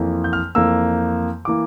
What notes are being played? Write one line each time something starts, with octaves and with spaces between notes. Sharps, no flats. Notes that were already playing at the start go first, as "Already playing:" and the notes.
Already playing: F2 E3 A#3
G6
F6
F2 E3 A#3 E6
E3 A#3 D6